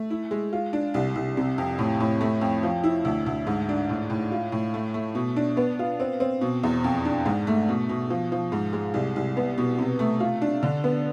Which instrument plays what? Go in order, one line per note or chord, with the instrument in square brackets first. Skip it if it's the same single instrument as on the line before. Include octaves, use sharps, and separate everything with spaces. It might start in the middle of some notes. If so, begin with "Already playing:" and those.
Already playing: [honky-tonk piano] A3
E4
G#3
F4
D4
C2
C2
C3
F2
A2
A2
A3
F2
F3
E4
D2
D2
G#2
D4
A2
A2
F4
A2
A3
A3
B2
D4
B3
F4
C4
C4
B2
E2
F2
D4
G#2
A3
B2
B2
F3
F3
G#2
G#3
C2
C2
B3
B2
C3
A3
F4
D4
D3
B3